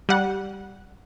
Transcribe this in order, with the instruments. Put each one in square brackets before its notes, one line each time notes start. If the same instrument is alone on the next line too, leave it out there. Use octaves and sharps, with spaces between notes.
[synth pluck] G3 F#5